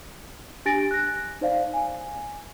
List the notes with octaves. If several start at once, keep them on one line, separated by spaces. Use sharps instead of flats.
D4 G4 G#5 A6 A#6 D7
F#6 A#6
D#4 C5 D5 F5
G#5